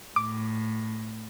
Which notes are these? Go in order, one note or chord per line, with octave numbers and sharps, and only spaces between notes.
A2 D6